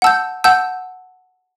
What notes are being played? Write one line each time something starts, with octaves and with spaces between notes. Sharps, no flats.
F#5 A5 E6 G6
F#5 A5 E6 G6